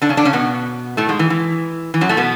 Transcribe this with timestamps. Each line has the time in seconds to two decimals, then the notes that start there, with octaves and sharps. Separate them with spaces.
0.02 D3 D4
0.09 C#3 C#4
0.17 D3 D4
0.25 C#3 C#4
0.33 B2 B3
0.97 A2 A3
1.09 G#2 G#3
1.19 E3
1.30 E3
1.94 E3
2.01 F#2 F#3
2.09 A2 A3
2.17 B2 B3